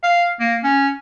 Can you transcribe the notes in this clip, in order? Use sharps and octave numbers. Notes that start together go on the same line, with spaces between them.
F5
A#3
C#4